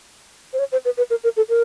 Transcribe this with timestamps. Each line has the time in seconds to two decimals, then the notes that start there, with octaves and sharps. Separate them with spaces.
0.53 C5
0.59 C#5
0.72 C5
0.85 B4
0.97 B4
1.10 A#4
1.24 A#4
1.37 A4
1.49 A#4